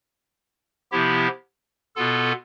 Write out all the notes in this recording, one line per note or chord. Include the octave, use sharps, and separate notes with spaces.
C3 F3 B3 E4 G4
B2 B3 F4 A4